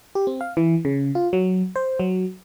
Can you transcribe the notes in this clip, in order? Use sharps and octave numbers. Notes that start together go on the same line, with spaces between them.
G4
C4
F5
E3
C#3
F4
F#3
C5
F#3